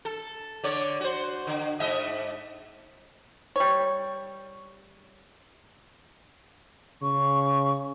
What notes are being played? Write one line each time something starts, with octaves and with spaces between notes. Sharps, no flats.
A4
D3 C#5 D5
F#4 C5
D3
G#2 D#5 E5
G3 C#5
C#3 C#6